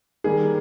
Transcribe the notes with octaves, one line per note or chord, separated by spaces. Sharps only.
D#3 G3 A#3 G#4